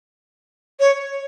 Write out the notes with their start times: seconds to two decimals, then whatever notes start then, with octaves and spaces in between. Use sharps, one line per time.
0.79 C#5